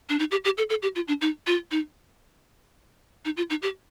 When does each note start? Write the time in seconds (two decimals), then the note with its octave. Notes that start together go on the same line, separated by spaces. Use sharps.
0.09 D4
0.19 D#4
0.31 G4
0.44 G4
0.58 A4
0.70 A4
0.82 G4
0.95 F4
1.08 D4
1.21 D#4
1.47 F4
1.71 D#4
3.25 D#4
3.37 F4
3.50 D#4
3.62 G4